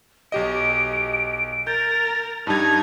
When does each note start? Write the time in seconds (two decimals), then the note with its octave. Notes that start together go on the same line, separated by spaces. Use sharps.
0.32 B1 G4 D#5 D7
1.67 A#4 G6 A6
2.47 G2 G3 D#4 A5 G#6